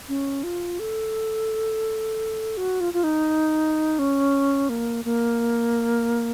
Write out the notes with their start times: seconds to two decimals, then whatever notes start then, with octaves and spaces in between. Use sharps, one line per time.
0.08 C#4
0.43 F4
0.80 A4
2.57 F#4
2.80 F4
2.94 F4
3.04 D#4
3.99 C#4
4.69 A#3
5.05 A#3